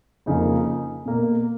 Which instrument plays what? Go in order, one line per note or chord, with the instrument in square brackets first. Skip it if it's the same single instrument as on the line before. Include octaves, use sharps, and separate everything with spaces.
[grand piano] F2 C#3 F3 A#3 D#4
B2 A#3